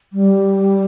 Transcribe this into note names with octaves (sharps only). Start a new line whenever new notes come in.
G3